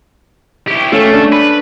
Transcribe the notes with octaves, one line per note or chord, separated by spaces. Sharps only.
E4 G4
A3 C#4 A4 F5
D4
B4